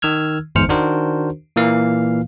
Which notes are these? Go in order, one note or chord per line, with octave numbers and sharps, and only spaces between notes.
D#3 E6 F6 G#6
G1 E2 G#2 C5 F6 C#7
D#3 D4 F#4 A#4 C5
A#2 E3 A#3 F5